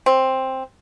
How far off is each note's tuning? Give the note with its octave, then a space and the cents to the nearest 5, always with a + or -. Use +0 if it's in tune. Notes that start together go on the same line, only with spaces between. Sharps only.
C4 +10